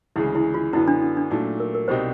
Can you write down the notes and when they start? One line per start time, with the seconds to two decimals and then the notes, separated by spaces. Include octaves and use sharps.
0.16 D2 C#3 E3 G#3 E4
0.35 E4
0.54 F4
0.73 F#2 D3 F#3 B3 E4
0.88 D4
1.02 D4
1.17 D4
1.31 A#2 F#3 A3 D#4
1.60 A#4
1.74 A#4
1.88 C2 B2 G3 C4 D#4 C5